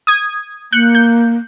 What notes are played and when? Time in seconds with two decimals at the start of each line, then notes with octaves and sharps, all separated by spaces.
0.07 D#6 G#6
0.72 A#3 F#6 G6 C#7
0.95 G6